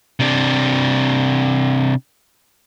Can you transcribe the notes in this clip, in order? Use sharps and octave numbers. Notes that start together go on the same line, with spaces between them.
C3 D4